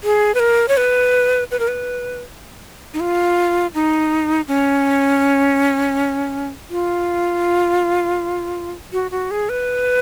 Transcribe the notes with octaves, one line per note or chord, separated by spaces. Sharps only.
G#4
B4
A#4
C#5
B4
B4
A#4
B4
D#4
F4
D#4
C#4
F4
F#4
F#4
G#4
B4